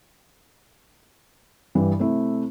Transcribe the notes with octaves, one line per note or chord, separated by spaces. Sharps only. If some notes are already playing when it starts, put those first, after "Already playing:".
G2 E3 G3
C3 A3 E4